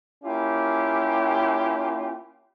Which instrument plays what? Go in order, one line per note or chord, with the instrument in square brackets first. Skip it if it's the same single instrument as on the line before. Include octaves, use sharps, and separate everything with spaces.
[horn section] A#3 C#4 E4 F4 G4